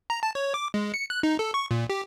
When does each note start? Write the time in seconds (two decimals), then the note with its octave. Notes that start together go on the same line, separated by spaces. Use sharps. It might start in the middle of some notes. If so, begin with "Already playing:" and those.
0.10 A#5
0.23 A5
0.35 C#5
0.54 D6
0.74 G#3
0.94 C#7
1.10 F#6
1.23 D#4
1.39 A4
1.54 C#6
1.71 A#2
1.90 G4